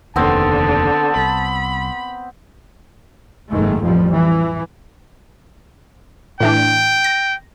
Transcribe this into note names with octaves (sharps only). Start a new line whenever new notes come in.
F1 D#2 D3 B3 C4 A5
C2 B5
F#1 G#2 D#3 A3
A1 F2 F3 G3
E3
A2 E3 D4 G5
A#6